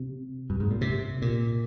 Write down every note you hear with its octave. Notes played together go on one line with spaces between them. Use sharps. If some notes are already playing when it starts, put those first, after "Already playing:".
Already playing: C3
G2
G#2
A#2
C3
A#2